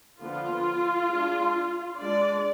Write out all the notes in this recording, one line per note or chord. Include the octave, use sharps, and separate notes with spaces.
D3 F3 B3 F4
G#3 D4
G#3 D4 D5